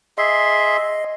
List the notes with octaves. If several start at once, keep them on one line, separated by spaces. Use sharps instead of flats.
G#4 D#5 E5 C6